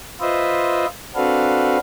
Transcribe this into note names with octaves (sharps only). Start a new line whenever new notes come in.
F4 B4 C5 D#5 E5
C4 D4 F#4 A4 B4 F5